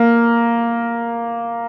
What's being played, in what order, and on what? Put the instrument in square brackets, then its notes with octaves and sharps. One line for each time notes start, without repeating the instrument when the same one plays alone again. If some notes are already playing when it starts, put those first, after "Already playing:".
Already playing: [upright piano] A#3